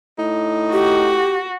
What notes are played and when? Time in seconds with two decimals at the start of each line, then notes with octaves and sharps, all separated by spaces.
0.18 A2 D#4
0.73 F#4 G4